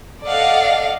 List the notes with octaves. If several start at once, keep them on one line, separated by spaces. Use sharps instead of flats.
A4 D5 D#5 F5 F#5